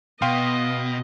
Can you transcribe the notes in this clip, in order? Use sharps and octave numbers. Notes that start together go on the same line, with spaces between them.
B2 B3 D#5 F5 G5 C6